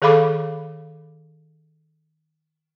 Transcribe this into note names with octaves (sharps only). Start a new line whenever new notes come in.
D#3 G#4 A4 F5 B5 D6